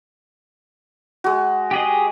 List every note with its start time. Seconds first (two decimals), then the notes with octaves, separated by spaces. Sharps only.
1.24 G#3 F#4
1.71 G4 G#4 D#5